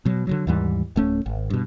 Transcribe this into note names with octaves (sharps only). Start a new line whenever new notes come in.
B2 F#3
D3 D#3 F#3
D#2 G#2 E3 G3
D1 A3 C#4
G#1
G2 B2